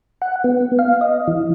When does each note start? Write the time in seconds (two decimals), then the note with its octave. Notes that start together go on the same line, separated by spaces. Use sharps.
0.22 F#5
0.44 B3
0.79 F5
1.01 D#5
1.28 E3